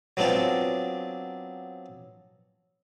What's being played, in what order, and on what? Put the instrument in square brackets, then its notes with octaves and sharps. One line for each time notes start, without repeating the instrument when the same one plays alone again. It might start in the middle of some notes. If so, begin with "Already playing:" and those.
[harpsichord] F#3 B3 C4 D4 F4